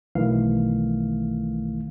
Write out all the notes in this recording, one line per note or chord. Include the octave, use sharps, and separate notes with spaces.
B1 D#3 E3 A3 F5